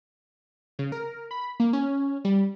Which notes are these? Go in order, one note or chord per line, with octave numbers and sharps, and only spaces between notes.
C#3
A#4
B5
A#3
C#4
G3